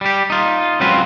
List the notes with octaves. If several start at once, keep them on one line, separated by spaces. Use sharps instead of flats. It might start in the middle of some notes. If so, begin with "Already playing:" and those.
G3 G4
D#4 F4
C#2 C#3 F#3 C4 F4 B4